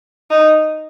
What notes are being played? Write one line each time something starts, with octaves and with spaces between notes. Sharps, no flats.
D#4